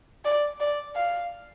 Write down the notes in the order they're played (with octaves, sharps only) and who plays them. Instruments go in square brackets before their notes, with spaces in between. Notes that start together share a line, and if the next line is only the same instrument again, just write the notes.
[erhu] D5
D5
F5